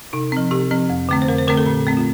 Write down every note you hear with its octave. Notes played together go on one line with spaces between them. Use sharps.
C3 D#4
F3 C4
C3 G4
F3 C4
F2
D3 A3 C4
C5
F2 A#4
C5
D3 A3 C4 A#4
A4
A#2
A3 C4
F4